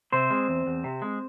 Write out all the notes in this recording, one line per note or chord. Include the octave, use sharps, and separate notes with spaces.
C3 C4 C5
G#3
E2
E2
C3
G#3